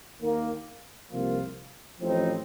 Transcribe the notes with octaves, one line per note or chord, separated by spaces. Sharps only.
D#2 D#3 A#3
C2 C3 F3 A#3 F4
A1 A2 F3 C4 D#4